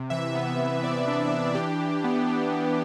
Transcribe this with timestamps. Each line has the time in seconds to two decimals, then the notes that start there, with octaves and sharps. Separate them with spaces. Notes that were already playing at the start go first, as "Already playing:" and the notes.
Already playing: C3
0.10 E3 E5
0.35 B3
0.58 E3
0.83 B3 D5
1.07 D4
1.31 D4
1.55 E3 G4
1.79 E3
2.04 B3
2.28 D4
2.52 E3